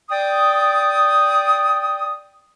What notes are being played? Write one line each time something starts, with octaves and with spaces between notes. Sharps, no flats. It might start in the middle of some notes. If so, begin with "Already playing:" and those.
D5 G5 D#6